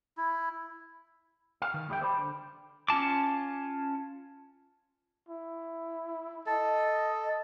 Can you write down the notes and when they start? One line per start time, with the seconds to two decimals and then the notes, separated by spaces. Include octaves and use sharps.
0.17 E4
1.62 F5
1.74 D#3
1.89 D#2 G3 G4 E5 G5
2.01 C5 D5 B5
2.18 D3
2.88 C#4 F4 A5 D6
5.29 E4
6.46 A4 D#5